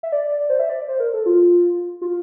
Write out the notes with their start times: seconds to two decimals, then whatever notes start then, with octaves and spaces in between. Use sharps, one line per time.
0.03 E5
0.12 D5
0.49 C5
0.59 E5
0.69 D5
0.88 C5
1.00 A#4
1.14 A4
1.26 F4
2.02 F4